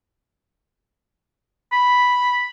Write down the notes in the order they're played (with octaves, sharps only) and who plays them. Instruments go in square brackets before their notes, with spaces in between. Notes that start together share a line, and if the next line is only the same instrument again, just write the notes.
[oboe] B5